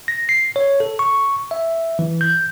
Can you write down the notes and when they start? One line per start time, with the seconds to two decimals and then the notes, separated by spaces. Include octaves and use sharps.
0.08 A#6
0.29 C7
0.56 C#5
0.80 A4
0.99 C#6
1.51 E5
1.99 E3
2.21 G6